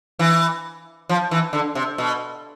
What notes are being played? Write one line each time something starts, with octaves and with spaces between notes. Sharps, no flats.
E3
F3
E3
D3
C3
B2